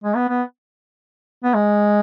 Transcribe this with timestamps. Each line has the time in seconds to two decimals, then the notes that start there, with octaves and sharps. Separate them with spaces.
0.04 G#3
0.16 B3
0.29 B3
1.44 B3
1.54 G#3